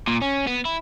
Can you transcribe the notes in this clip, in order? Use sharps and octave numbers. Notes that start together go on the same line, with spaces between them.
A#2
C#4
B3
E4